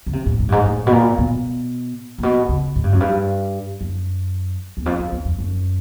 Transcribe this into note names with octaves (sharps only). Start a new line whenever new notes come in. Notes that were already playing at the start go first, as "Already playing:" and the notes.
C#3
C3
A2
G#2
G2
G#2
A2
B2
A#2
B2
A#2
B2
C#3
G#2
G2
F#2
G2
F#2
E2
F2
F2
E2
F2
F#2